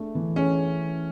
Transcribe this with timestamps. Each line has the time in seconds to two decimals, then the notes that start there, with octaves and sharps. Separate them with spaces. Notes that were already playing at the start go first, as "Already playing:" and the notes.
Already playing: A3 D4 G#4
0.15 E3
0.36 C#4 G#4